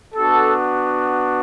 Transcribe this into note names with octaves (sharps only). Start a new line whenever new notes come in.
B3 D4 F#4 A4